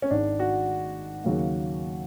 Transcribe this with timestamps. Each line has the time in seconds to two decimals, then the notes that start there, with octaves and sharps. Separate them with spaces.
0.02 C#4
0.11 G#1 G#2 D#3 D4
0.39 F#4
1.24 D#2 C#3 F#3 A#3